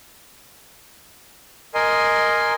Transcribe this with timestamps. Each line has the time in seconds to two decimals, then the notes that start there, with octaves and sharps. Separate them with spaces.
1.74 A#4 D#5 G#5 C6